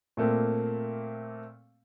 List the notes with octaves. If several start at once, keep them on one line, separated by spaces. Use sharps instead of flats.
A#2 A3 A#3 C4